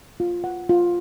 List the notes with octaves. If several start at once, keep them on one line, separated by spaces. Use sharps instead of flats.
F4
F#5
F4